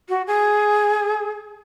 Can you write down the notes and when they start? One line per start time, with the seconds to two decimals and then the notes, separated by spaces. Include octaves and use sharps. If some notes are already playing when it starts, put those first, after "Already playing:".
0.09 F#4
0.27 G#4